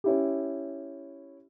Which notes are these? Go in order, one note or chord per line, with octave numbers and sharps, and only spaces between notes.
C#4 E4 G4